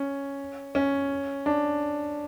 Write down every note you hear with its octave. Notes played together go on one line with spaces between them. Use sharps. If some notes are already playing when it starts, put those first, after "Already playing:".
Already playing: C#4
C#4
D4